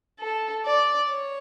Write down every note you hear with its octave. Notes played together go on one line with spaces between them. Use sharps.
A4
D5
C#5